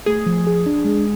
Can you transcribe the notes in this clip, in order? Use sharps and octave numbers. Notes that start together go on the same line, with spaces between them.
A3 G#4
F3
G#4
D4
G#3